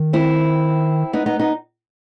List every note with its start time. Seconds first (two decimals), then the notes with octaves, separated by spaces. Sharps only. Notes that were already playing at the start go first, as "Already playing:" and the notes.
Already playing: D#3
0.13 C4 E4
1.13 B3 D#4
1.26 B3 D#4
1.39 B3 D#4